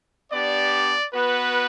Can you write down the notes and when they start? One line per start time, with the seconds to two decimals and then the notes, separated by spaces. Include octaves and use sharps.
0.30 B3 D4 G4 D5
1.13 B3 F#4 B4